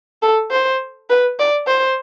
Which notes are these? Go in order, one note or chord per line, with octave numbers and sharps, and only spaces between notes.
A4
C5
B4
D5
C5